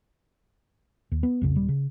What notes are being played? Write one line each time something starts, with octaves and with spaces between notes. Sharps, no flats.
D#2
B3
B1 F2 C#3
D#1 G3
C#3